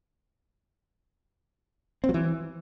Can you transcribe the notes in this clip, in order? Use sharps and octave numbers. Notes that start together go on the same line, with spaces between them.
C4
F#3
E3